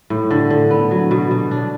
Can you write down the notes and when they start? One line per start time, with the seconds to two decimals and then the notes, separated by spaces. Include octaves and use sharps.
0.10 A2
0.31 D3
0.50 D3
0.71 B3
0.91 F#3
1.11 B2
1.31 B2
1.51 D4